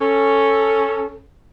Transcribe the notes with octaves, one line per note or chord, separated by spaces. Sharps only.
C#4 A4